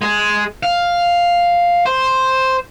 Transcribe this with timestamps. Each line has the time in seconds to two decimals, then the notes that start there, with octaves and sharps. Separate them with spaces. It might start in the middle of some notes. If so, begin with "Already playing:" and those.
0.01 G#3 G#4
0.63 F5
1.86 C5